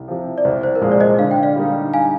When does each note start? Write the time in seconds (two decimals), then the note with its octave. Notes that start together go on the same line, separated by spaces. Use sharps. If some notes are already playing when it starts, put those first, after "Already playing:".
Already playing: C2
0.08 C3 F3
0.38 D5
0.45 C2 C5
0.63 C5
0.75 A#4
0.81 A#2 F3 G#3 C5
0.92 D5
1.01 C5 D#5
1.19 D3 F5
1.31 G5
1.43 D5 F5
1.56 G3 A#3 D#4
1.94 F5 G#5